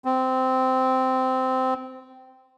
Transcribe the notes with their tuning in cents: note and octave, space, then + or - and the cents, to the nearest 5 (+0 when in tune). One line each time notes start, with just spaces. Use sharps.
C4 -15